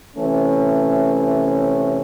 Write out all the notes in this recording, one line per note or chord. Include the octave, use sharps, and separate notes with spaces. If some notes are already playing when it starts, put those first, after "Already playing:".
C3 E3 A3 C#4